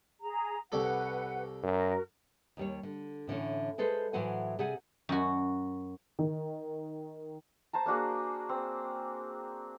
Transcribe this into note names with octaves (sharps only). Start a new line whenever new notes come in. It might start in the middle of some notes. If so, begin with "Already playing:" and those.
G#4 A#5
C2 G3 A4 B4 F#5
F#2 F#4 A#4
D#2 G3 C#5
D3
A2 D3 E3 C#4
G#3 G#4 A4 B4 C5
A2 E3 F#3 C5 F#5 G#5
C3 G#4 D5 F#5 G#5
F#2 F#4
D#3
C5 A5 A#5
A#3 D4 F#4 G#4
C4